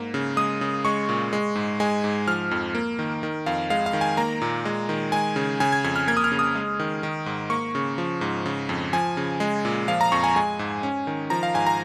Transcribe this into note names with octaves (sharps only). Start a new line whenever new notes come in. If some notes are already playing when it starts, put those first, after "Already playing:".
Already playing: G#2 A#3
C#3
G#3 D#6
C#3
G#3 C#6
A#2
G#3
G#2
G#3 G#5
G#2
F3 F6
F2
A#3
D#3
D#3
F2 F5
G#3 F5
F5
D#3
G#5
A#3 A#5
A#2
G#3
D#3
G#3 G#5
C#3
C#3 G#5
G#6
F2 G#6
F6
A#3 G#6
D#6
F6
C#3
D#6
G#3
D#3
D#3
G#2
A#3 C#6
C#3
F3
G#2
C#3
F2
F3 G#5
C#3
G#3
A#2
F3 F5
A#5
F2 C#6
G#5
G#3 G#5
G#2
C#4
D#3
F3 A#5
F5
G#2 G#5
A#5